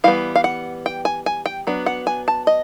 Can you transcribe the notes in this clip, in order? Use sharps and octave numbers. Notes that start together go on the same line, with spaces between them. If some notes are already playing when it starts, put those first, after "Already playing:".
E3 G3 B3 F5
F5
F#5
G5
G#5
G#5
G5
F#3 B3 D4
F#5
G#5
A5
D#5